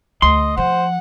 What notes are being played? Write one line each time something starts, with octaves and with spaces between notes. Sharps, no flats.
D2 D#5 C6
F3 C5 F#5